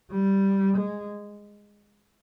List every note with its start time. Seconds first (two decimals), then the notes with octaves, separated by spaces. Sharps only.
0.11 G3
0.77 G#3